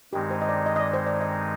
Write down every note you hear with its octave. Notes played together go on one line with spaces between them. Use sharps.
G2 D#3 G#3 C4 D#4 G4
C5
D#5
D5
D#5
D#5
D5
C5
D5
D#5